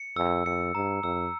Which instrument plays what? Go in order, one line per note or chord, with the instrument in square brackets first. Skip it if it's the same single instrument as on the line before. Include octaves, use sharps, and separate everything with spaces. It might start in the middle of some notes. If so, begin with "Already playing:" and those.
Already playing: [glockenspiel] C#7
[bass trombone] F2 [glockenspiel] E6
[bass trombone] F2 [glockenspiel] C#7
[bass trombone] G2 [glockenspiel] A#5
[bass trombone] F2 [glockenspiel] E6